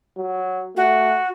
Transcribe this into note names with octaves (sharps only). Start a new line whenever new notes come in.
F#3
A3 F#4